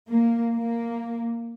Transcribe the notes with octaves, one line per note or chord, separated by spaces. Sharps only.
A#3
A#3